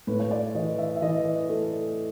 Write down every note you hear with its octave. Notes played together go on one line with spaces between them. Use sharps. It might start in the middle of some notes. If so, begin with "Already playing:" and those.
A2 B4
C#5
D5
E3 D#5
E5
E5
E3 D#5
A3